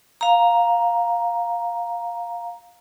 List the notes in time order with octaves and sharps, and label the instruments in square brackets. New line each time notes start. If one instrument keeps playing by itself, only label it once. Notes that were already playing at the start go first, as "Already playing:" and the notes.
[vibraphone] F5 A#5